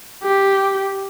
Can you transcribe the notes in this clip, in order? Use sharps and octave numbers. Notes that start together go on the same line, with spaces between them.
G4